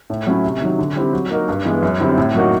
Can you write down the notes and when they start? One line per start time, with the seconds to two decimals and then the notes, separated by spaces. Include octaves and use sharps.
0.10 A2
0.27 F#3 A3 C#4 E4
0.44 C3
0.62 D#3 F#3
0.79 D3
0.96 G3 C4 E4 G4
1.13 F#3
1.30 A#3 D#4 F#4 A#4
1.49 G2
1.65 E3 G#3 B3
1.82 F#2
2.00 D3 G3 C4 E4
2.18 A2
2.35 F#3 A#3 D#4 F#4